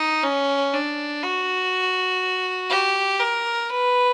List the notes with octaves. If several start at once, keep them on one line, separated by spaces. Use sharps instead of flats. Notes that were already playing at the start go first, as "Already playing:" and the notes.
Already playing: D#4
C#4
D4
F#4
G4
A#4
B4